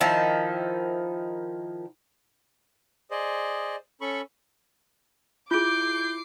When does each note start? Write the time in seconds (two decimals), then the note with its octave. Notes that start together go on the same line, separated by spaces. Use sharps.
0.01 D#3 F3 D#4 E4
3.11 G#4 C5 D5 D#5
4.01 C#4 A4 B5 C#6
5.51 E4 F4 G#4 D6 G6 C7 D7